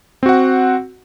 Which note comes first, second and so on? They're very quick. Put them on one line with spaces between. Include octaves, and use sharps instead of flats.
C4 F#4 F#5